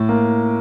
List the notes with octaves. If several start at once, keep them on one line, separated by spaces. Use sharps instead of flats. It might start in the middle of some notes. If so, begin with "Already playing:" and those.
Already playing: A2
A#3